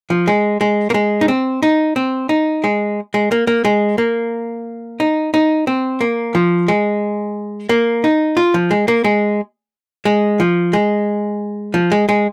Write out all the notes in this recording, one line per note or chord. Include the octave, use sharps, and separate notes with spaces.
F3
G#3
G#3
A#3
G#3
D#4
C4
D#4
C4
D#4
G#3
G#3
A#3
A#3
G#3
A#3
D#4
D#4
C4
A#3
F3
G#3
A#3
D#4
F4
F3
G#3
A#3
G#3
G#3
F3
G#3
F3
G#3
G#3